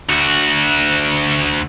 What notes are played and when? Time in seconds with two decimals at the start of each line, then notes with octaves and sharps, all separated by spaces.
0.09 D2 F#4